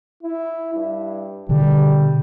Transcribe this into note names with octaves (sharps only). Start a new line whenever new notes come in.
E4
G2
B2 D3 G3